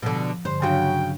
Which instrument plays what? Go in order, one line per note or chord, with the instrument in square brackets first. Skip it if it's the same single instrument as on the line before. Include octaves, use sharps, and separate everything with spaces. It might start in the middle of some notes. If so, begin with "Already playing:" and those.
[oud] B2 D3 [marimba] F3
[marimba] G2 D3 [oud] C5
[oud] C#3 F#4 [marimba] F#3 D4 C6 [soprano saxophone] G5